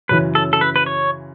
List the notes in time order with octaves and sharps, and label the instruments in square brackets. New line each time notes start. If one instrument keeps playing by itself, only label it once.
[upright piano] F#2 C#3 E3 [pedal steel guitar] B4
[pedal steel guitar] A4
A4
B4
B4
C#5